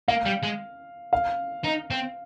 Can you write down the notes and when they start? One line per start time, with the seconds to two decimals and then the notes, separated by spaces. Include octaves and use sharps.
0.08 A#3 F5
0.25 G3
0.43 G#3
1.13 F5
1.64 D#4
1.90 C4